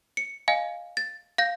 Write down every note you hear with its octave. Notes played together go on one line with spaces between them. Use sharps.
C#7
D#5 F5 G#5
A6
F5 G6 A#6